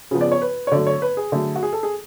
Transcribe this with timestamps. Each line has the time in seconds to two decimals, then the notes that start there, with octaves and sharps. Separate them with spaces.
0.11 C#3 F3 B3
0.21 D5
0.32 C#5
0.42 B4
0.67 C#5
0.72 D3 F#3 A3 D5
0.87 C#5
1.02 B4
1.17 G#4
1.32 D3 F#3 A3
1.56 F#4
1.63 G#4
1.73 A4
1.83 G#4